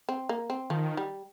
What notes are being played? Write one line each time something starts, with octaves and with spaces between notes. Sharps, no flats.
C4
A#3
C4
D#3 F3
G3